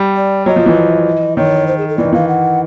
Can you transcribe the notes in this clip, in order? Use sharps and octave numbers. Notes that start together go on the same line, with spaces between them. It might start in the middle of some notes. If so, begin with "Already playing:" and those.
Already playing: G3
D5
F#3 D#5
F3
E3
D#3 C#5
C5
G#4
A4
E3 D5
D#3
E3 F5
F#5